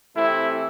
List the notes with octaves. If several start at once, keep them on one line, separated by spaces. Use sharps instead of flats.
C3 E3 A3 C4 E4